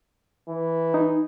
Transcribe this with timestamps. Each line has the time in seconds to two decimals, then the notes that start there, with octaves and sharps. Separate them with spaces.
0.49 E3
0.94 D#4